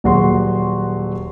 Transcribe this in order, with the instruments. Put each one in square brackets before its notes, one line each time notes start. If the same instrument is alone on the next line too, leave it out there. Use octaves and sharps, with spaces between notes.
[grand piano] D#1 F#3 F#4 G#4 C6